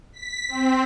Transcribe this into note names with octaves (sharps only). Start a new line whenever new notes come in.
B6
C4